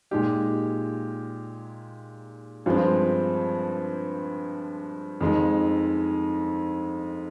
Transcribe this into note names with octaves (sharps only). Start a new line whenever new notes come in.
A#2 G#3 D#4 G4
G2 F3 G#3 C4
F2 D#3 G#3